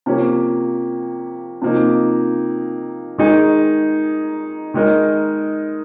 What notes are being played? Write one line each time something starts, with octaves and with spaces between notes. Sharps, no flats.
C3 F3 A#3 C#4 G4
C3 F3 A#3 D#4
D#3 G#3 D#4 G#4
D#3 G#3 D#4 A#4 D#5